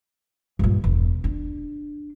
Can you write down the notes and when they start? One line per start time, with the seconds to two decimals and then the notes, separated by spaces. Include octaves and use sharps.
0.59 G2 A#2
0.84 E1
1.24 D4